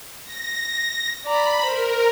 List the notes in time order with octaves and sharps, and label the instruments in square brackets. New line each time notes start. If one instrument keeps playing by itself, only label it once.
[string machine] A#6
[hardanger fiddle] D5 A#5 [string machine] B5
[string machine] A#4 [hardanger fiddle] C5